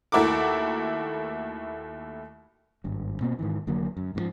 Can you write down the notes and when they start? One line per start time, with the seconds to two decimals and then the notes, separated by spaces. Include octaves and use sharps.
0.12 D#2 A3 E4 F#4 A#4 D6
2.84 G#1 G2
3.21 B2 A#3 C4
3.39 G#2 D#3 E3
3.67 F1 D3 F#3 A#3
3.97 F#2
4.15 G#2 B2 F3